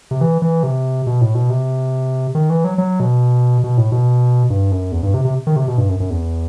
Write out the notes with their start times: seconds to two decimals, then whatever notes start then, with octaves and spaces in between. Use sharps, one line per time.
0.11 C3
0.21 E3
0.42 E3
0.63 C3
1.07 B2
1.21 A2
1.35 B2
1.50 C3
2.35 D#3
2.50 E3
2.64 F#3
2.78 F#3
3.00 B2
3.64 B2
3.78 A2
3.92 B2
4.50 G2
4.72 F#2
4.92 E2
5.03 G2
5.14 C3
5.25 C3
5.47 D#3
5.56 C3
5.68 B2
5.78 G2
5.89 F#2
6.00 F#2
6.10 E2